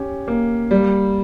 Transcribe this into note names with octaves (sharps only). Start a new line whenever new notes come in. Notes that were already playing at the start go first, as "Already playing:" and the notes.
Already playing: C#4 G4
A#3
G3